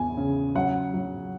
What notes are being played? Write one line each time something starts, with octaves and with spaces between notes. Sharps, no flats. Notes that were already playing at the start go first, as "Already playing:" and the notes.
Already playing: E2 G#5
C#3
F#3 F#5
F#3